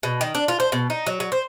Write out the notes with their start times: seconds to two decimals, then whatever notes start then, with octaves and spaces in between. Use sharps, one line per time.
0.03 B2
0.21 D#3
0.35 D4
0.48 F4
0.60 C5
0.72 B2
0.90 D#4
1.07 F#3
1.20 F#3
1.32 C5